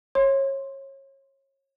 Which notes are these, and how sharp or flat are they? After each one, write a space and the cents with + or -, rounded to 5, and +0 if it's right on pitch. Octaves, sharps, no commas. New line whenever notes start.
C#5 -30 C6 +0